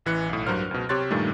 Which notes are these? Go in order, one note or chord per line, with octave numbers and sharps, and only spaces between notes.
A1 E3 F#6 C#7
B1 A2
G2 F#3 A#4 C5 F6
C#2 B2
C3 G4 C#5 C6 F#6 A6
G2 A#2 D#3 G3 A3